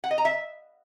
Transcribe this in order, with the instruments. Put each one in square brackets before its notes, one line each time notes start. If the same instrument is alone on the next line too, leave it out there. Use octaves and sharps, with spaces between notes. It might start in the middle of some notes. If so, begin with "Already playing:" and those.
[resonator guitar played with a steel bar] F#5
D#5
A#5
E5